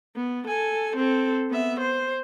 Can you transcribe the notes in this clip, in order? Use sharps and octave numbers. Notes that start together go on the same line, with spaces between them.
B3
A4 G#5
C4 A4
B3 E5
C5